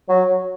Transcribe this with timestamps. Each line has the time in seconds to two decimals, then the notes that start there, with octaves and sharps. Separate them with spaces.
0.09 F#3